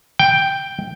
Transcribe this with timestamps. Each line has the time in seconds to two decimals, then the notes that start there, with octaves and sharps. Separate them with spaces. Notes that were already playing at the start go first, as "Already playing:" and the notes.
0.19 G5